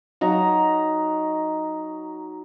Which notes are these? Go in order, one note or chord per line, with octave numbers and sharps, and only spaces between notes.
F#3 D#4 A#5